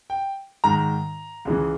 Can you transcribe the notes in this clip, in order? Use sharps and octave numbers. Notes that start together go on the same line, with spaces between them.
G5
G#2 D#3 A#5
C#2 C#3 E3